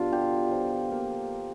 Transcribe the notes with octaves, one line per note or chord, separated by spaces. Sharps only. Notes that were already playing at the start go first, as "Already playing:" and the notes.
Already playing: B2 G3 D4 F4
D3 G4
F3
A#3